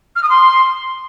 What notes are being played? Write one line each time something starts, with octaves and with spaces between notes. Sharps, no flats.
F6
D#6
C6